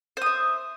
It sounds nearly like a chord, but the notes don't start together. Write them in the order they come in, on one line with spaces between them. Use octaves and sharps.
C5 D#6 E5